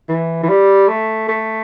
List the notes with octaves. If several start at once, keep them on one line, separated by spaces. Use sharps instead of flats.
E3
E3
G3
A3
A3